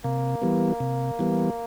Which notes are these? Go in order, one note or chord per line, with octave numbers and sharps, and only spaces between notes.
C3 A#3
E3 G3 B3
C3
E3 G3 B3